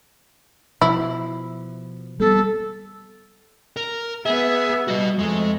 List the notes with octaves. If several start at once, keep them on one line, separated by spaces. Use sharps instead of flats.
B2 F3 E4
G3 B3 A4
A#4
B3 G#4 E5
G3 F#4 D#5
F2 G#3 A3